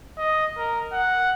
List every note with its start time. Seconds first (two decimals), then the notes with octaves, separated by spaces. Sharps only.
0.17 D#5
0.57 A#4
0.92 F#5